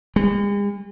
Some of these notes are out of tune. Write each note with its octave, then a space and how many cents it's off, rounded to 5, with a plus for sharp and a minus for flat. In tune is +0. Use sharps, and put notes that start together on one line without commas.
G#3 -45